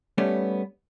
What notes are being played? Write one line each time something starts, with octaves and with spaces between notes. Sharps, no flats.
G3 A3 B3 C#4